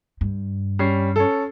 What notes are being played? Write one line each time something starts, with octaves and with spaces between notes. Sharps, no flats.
G2
G3 C#4 C7
C#4 A4